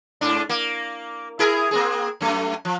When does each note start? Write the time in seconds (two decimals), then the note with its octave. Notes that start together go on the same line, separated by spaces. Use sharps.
0.21 G#2 D4
0.49 A#3
1.39 E4 G#4 A#4
1.71 A#3 C4 G#4
2.21 F#2 A3
2.65 F3